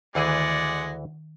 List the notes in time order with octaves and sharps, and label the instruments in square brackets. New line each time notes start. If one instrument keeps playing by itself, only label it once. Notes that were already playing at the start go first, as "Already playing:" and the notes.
[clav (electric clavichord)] D2 E3 G#4 [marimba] D#3 [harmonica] G#3 D5 F#5